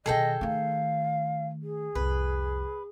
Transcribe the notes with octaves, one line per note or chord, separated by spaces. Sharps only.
B2 D#3 G#4 A4 D#5 G5
D#3 A3 F5
G#4
C2 F2 B4